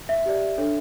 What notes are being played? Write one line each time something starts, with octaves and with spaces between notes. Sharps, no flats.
E5
G4 D5
D4 A4 C#5